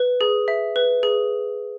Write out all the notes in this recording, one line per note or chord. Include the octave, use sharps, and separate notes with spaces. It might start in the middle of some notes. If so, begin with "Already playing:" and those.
Already playing: B4
G#4
E5
B4
G#4